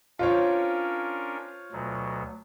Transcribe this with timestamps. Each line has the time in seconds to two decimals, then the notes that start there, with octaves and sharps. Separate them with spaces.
0.19 C#4 D4 F4 A#4 C5 C#5
1.72 D2 B2 F#3